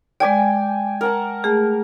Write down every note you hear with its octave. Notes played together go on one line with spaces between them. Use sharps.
G#3 D5 G5 G#5 D6
A#4 F#5 A5
A3 G#4